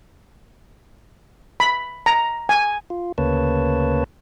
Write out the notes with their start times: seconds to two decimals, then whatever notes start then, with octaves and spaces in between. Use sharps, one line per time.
1.60 B5
2.06 A#5
2.49 G#5
2.90 F4
3.18 D2 C#3 A#3 B4 C#5 A5